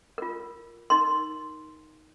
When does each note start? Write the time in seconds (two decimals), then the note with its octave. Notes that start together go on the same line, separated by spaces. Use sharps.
0.18 F4 A#4
0.90 D#4 A#4 C6